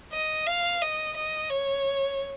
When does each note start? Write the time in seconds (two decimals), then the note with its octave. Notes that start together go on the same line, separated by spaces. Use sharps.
0.13 D#5
0.47 F5
0.82 D#5
1.17 D#5
1.50 C#5